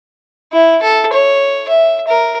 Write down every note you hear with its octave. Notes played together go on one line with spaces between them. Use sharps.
E4
A4
C#5
E5
A#4